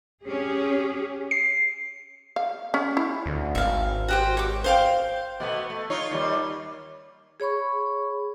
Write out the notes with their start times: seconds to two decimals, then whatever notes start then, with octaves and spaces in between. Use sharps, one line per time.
0.24 C#4 G4 G#4
1.31 C7
2.36 F5
2.74 C#4
2.97 E4
3.26 D2
3.55 G#1 E5 F5
4.08 F#4 G4 C5
4.37 C#5 D6
4.64 C5 F5 G5
5.40 B2 A3 B3
5.70 A3
5.90 D#4 F4 C#5
6.11 D#2 G3
7.40 G#4 C#5 B5 C#6